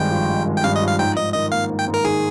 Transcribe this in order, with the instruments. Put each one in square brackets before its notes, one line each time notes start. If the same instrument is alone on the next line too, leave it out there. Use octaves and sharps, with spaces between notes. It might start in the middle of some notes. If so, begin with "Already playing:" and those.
Already playing: [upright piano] G#1 G2 G#3 [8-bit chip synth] G5
[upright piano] F3
G#3
G#1
[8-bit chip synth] G5
[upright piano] G2 [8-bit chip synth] F5
[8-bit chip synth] D#5
[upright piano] F3
[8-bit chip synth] F5
[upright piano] G#2 [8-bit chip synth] G5
[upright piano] G#2 [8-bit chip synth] D#5
[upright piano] D#3 [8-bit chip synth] D#5
[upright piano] A#3 [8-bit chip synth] F5
[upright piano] G#2
[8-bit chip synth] G5
[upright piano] G#2
[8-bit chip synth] A#4
[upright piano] D#3 [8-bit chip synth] G#4